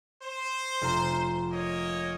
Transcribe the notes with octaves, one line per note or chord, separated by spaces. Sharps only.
C5
F1 F4 A#5
A#3 C#5 D#5